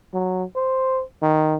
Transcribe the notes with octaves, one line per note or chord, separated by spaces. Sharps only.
F#3
C5
D#3